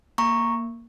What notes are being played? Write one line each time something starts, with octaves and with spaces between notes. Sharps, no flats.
A#3 A#5 C#6